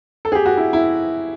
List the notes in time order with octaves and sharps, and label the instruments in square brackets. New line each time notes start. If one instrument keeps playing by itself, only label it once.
[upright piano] A4
G#4
G4
F#4
E4
E4